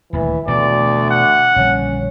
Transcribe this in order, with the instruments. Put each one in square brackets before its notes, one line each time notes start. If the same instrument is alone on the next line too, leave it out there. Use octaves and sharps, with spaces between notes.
[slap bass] D#1 D2 [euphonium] E3
[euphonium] D2 [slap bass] B2 E3 A3 [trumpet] D5
[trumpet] F#5
[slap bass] A#1 D3 G3 [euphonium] C#4